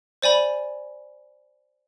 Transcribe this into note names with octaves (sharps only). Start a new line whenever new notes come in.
C5 D5 G#5 B5